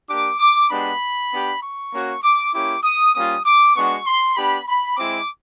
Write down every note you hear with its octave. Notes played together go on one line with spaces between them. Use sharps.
A#3 D4 G4 D6
D6
G#3 B3 D4 G4 B5
B3 D4 G4
C#6
A#3 C#4 F#4
D6
A#3 C#4 E4 G4 D6
D#6
G3 A#3 C#4 F4 D#6
D6
G#3 B3 D4 F#4 C#6
C6
B3 D4 G4 B5
B5
G#3 C4 E4 D6